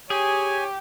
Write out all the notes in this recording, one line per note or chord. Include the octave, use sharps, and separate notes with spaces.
G4 G#4 C#5 G#5